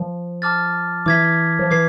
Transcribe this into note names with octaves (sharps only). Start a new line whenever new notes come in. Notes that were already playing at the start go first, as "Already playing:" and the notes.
Already playing: F3
A5 D6 F6 A6
E3 D6 G#6 B6
F3
E3 D6 G#6 C7